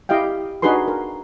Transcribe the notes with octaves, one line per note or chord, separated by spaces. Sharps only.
E4 G4 D#5 F5 G5
D4 D#4 F#4 G#4 B4 C6
A#4